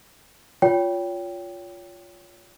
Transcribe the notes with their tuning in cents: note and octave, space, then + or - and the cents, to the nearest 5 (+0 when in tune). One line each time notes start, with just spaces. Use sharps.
F4 +5 C#5 +30 G5 +0